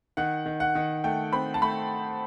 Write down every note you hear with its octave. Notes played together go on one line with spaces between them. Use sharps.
D#3 F#5
D#3
F#5
D#3
A3 G5
C4 B5
A5
A3 B5